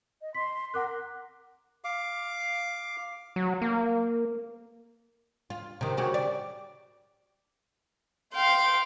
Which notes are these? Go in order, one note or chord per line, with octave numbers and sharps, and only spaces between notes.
D#5
C6 B6
A#4 F#5 D6 F#6
F5 D6
F#3
A#3
F4
C3 D#3
C#3 F#4 G4
D5
F5 G5 C6